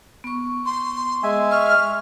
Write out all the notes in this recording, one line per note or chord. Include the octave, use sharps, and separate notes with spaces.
B3 C#6
C6
G#3 E5 G#5
C#6 F6